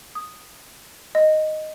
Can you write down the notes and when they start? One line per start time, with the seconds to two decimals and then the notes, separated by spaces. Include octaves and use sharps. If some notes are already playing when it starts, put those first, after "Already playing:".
0.15 D#6
1.15 D#5